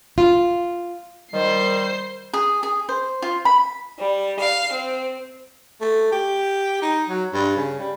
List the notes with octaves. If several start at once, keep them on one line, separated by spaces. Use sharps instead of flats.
F4
D#3 G3 C5 C7
G#4
G#4
C5
F4
B5
G3
F5
C4
A3
G4
D#4
F#3
G2
C#3
G3